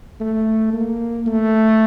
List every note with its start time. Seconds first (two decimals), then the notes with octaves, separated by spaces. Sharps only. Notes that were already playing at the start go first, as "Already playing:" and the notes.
0.20 A3
0.73 A#3
1.27 A3